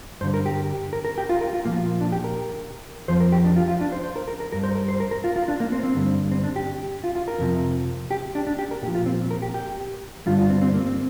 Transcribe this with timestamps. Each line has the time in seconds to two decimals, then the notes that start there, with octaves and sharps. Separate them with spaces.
0.21 G2 C5
0.24 D3 G3
0.34 A#4
0.46 G4
0.93 A#4
1.05 A#4
1.18 G4
1.29 F4
1.41 A#4
1.53 F4
1.65 A#2 F3 A#3
1.77 F4
2.01 D4
2.12 G4
2.24 A#4
3.08 F2 F3 C5
3.20 A#4
3.32 G4
3.45 D4
3.56 F4
3.68 F4
3.81 D4
3.92 C5
4.04 C5
4.16 A#4
4.28 A#4
4.40 A#4
4.52 G2 G3 A#4
4.63 C5
4.75 A#4
4.89 C5
5.00 A#4
5.11 A#4
5.24 F4
5.36 F4
5.48 D4
5.60 A#3
5.72 C4
5.83 C4
5.95 G2 D3 G3
6.32 C4
6.44 D4
6.56 G4
7.04 F4
7.15 F4
7.28 A#4
7.39 F2 C3 F3
8.11 G4
8.35 D4
8.47 D4
8.59 G4
8.71 A#4
8.82 A#2 G4
8.87 F3
8.95 F4
9.06 C4
9.31 A#4
9.42 G4
9.54 G4
10.26 G2 D3 G3 F4
10.39 F4
10.50 C4
10.62 C4
10.74 A#3
10.87 C4